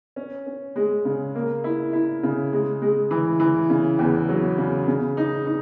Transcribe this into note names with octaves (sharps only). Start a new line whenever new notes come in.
C#4
C#4
G#3
C#3
A#3
E4
E4
C#3
G#3
G#3
E3
E3
C#3
E2
F#3
C#3
C#3
D#4
D#4